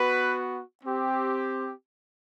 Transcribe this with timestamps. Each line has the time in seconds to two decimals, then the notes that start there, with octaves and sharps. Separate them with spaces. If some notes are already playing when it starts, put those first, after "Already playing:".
Already playing: B3 F#4 B4
0.83 C4 G4